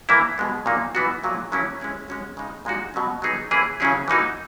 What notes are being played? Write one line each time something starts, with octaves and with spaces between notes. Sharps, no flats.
E3 A#3 E4
B2 G#3 B3
A#2 F#3 A#3 D#4 G#4
E3 B3 D#4 F#4
A#2 F#3 A#3 E4 G#4
C#3 F#3 A#3 C#4 E4
G#3 C#4 E4 G#4
G#3 C#4 F#4
C#3 G#3 D#4
A#2 G#3 D#4 F#4
B2 F#3 C#4
F#3 B3 D#4 G#4
E3 A#3 C#4 E4 G#4
C#3 F#3 C#4 E4 G#4
E3 A#3 D#4 F#4